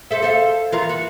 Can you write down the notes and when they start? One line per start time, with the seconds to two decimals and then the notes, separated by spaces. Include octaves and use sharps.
0.11 C4 A4 E5
0.22 A4 C5 F5
0.72 E3 F4 A#4
0.89 F#4